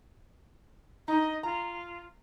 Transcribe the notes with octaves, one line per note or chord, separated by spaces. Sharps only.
D#4 D#5
F4 A#5